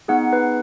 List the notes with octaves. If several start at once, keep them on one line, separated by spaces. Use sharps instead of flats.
B3 D#4 G#4 F#5
B4